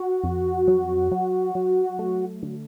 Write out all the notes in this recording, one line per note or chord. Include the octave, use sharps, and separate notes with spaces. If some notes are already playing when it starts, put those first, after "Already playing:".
Already playing: F#4
F2
F#3
F#3
F#3
A3
D3